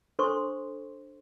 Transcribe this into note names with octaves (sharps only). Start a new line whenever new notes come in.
D4 A4 C5 C6 C#6